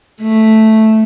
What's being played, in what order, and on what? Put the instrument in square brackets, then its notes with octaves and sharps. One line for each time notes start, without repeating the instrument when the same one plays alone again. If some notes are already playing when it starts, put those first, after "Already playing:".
[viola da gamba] A3